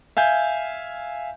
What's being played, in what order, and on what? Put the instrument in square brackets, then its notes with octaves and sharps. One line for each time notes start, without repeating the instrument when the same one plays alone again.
[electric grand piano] E5 F5 G#5 G6